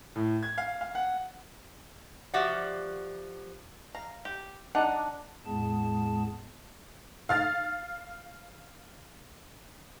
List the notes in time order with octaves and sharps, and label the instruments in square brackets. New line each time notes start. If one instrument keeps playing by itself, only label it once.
[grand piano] A2
G#6
F5
F5
F#5
[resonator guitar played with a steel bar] F3 F#4 G4 D5 E5 F#5
[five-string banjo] F5 A#5
G4
[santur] D4 [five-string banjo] D#4 [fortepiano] D#5 F#5
[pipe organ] E2 A2 G#3 B3 G#4 A5
[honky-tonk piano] F5 F6 A6